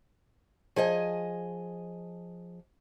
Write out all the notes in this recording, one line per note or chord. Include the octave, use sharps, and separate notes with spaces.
F3 G#4 D#5 G#5